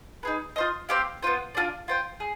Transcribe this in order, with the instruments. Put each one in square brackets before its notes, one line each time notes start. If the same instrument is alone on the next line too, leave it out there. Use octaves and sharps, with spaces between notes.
[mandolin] D#4 G#4 B4
F4 C5 D#5
C4 G4 C5 F5
B3 F4 C5
D4 F4 G#4 D5
F4 C5 G5
G#4